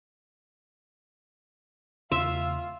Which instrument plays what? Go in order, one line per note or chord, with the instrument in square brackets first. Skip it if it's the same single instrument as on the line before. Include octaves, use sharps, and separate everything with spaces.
[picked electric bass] E2 C#3 A3 [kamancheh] F4 [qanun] E5 [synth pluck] C6 E6